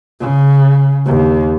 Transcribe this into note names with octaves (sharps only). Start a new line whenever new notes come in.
C#3
D#2